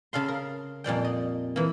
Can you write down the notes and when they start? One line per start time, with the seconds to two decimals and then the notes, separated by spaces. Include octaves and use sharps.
0.13 C#3 A4 F5 C6
0.28 A#4
0.84 F2 A#2 G3 G5
1.04 D#5
1.56 E3 A#3